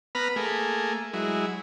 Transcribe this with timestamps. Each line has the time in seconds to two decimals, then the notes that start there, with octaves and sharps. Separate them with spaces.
0.15 B3 B4 A#5 B5 F6
0.36 A3 A#3 G#4
1.13 F#3 G#3 E4